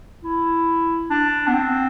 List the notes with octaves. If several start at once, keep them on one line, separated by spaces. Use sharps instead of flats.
E4
D4
B3
C4